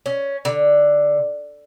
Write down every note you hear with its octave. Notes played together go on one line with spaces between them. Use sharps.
C#4
D3